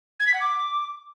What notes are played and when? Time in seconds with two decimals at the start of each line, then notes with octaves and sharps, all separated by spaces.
0.20 G#6
0.27 B6
0.34 F#5
0.41 D6